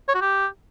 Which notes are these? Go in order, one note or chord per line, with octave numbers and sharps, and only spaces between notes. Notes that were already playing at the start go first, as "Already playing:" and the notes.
C#5
F#4
G4